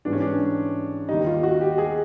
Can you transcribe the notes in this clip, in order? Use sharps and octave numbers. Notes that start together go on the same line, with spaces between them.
G#2 E3 G3 D4
C#4
D4
D#2 D#3 G3 D#4
F4
F#4
G4
G#4